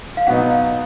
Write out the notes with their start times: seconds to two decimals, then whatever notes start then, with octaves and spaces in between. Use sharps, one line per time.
0.17 F5
0.27 B2 F#3 B3 D#4 F#5
0.51 F5